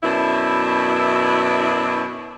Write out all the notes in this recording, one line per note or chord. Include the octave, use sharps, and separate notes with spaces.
F#2 B2 D4 E4